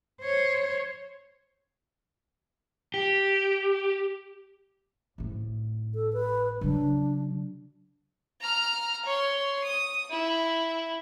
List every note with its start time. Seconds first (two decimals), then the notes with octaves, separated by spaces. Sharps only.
0.22 C5 C#5
2.94 G4
5.18 G#1 A2
5.95 A4
6.13 B4
6.61 C#3 F#3 D4
8.41 A#5 F6
9.05 C#5 C6
9.64 D#6
10.10 E4